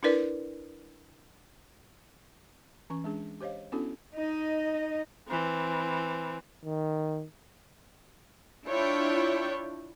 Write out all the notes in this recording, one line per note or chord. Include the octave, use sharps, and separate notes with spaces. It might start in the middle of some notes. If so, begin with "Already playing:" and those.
D4 E4 A#4 B4 D5
E3 C#4 C#6
G#3 D4 G#4
G4 C5 C#5 D#5 F5
B3 C#4 D4 E4 F#4 A4
D#4 D#5
E3 C4
D#3
D4 E4 F4 C#5 G5